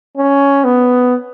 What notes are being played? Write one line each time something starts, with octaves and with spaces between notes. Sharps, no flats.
C#4
B3